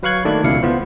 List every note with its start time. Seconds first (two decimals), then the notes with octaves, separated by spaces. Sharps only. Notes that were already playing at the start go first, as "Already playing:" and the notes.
0.03 F#3 B4 F5 C#6 F#6 G#6
0.25 D#3 A3 A#3 D4
0.44 C#2 B2 E3 E4 F5 C#7
0.63 B3 F4 C5